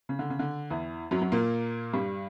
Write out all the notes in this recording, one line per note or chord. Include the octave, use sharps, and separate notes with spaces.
C#3
D3
C#3
D3
E2 E3
F#2 F#3
F#2 F#3
A#2 A#3
G2 G3